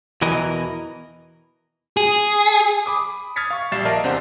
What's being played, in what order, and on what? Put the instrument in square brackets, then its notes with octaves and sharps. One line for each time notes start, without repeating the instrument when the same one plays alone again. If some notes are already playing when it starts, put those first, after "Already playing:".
[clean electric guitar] E2 B2 E3 A#4 D#5
[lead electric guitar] G#4
[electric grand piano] B5 D6 D#6
D#6 F6 G#6 A6 B6 C#7
F5 C#6
A#1 G3 E5 A6 C7 E7
A#4 D5 D#5 F5 A5
E2 C3 D4 C5 F#5